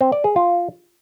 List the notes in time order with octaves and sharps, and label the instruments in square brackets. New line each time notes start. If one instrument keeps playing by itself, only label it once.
[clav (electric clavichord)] C4
D5
G#4
F4